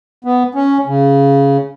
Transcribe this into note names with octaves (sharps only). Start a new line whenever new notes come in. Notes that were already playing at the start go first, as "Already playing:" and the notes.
B3
C#4
C#3